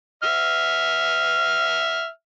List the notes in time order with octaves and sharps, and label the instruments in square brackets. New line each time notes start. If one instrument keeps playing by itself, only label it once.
[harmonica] E5 F6